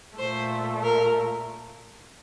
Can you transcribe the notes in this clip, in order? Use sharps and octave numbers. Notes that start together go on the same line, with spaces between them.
A#2 A3 C5
A#4